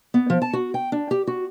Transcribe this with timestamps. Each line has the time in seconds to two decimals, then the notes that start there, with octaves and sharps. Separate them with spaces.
0.14 B3
0.30 F3
0.42 A5
0.53 F#4
0.74 G5
0.92 D4
1.11 G4
1.27 F#4